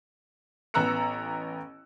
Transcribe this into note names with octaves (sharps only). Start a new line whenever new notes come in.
A1 B3 A#5 E6 F#6 C#7